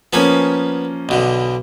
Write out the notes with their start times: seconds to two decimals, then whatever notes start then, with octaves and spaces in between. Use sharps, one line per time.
0.13 F3 A#3 B3 C#4 B4 G#5
1.09 B1 B2 D3